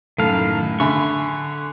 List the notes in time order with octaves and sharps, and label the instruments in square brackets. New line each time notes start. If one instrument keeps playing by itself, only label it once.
[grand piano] F#2 A2 [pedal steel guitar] D#3 F5 [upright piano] A4
[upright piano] D3 [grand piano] E5 G#5 B5 [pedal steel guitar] C#6